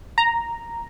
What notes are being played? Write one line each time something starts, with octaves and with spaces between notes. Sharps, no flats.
A#5